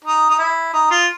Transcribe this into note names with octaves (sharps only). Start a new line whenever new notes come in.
D#4
D#4
E4
D#4
F4